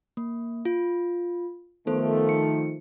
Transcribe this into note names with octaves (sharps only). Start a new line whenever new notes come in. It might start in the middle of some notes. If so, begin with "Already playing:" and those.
A#3
F4
D#3 F3 A3 B3 A4 C5
C#7